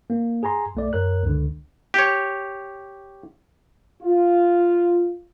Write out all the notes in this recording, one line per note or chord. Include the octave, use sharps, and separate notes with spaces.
A#3
G#4 G#5 A#5 C6
B1 A3 D5
F#2 A#4 C#5 F#6
C#2 D3
G4 C#5
F4